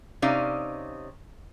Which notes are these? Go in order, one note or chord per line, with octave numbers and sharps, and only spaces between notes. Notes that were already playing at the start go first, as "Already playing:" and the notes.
C3 C#4 D#4 D5 F5